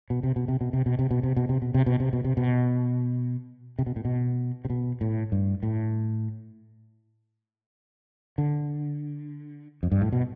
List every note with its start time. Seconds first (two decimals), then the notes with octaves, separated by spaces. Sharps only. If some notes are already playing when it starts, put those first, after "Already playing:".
0.10 B2
0.23 C3
0.36 B2
0.48 C3
0.61 B2
0.73 C3
0.86 B2
0.99 C3
1.11 B2
1.23 C3
1.36 B2
1.49 C3
1.62 B2
1.74 C3
1.86 B2
2.00 C3
2.13 B2
2.24 C3
2.37 B2
3.79 C3
3.86 B2
3.96 A2
4.05 B2
4.65 C3
4.70 B2
5.01 A2
5.32 G2
5.63 A2
8.38 D3
9.83 F2
9.92 G2
10.02 A2
10.12 B2